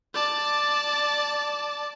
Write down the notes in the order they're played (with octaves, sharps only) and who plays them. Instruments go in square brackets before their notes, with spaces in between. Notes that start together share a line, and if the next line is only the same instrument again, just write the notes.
[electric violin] D5 A5